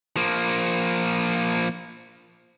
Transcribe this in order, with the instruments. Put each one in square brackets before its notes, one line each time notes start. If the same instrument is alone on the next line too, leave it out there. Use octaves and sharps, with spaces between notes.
[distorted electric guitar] F3 A#3